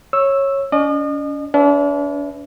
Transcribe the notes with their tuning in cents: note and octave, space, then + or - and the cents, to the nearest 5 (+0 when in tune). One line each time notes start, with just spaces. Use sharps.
C#5 -15 E6 +0
C#4 +40 D#5 -40
D4 -40 B4 +20 E5 +0